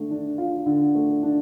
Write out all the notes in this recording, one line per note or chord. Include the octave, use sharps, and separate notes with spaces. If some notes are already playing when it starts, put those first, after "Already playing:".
Already playing: D3 A3
D4
F4
D3
A3
D4